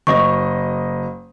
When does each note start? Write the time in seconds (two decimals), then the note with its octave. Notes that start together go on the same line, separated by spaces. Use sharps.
0.07 F#1 D#5 C#6